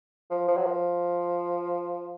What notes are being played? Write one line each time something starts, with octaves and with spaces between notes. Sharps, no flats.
F3
F3
F#3
F3